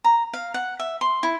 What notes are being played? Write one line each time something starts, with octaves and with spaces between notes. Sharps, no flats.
A#5
F5
F#5
E5
C6
E4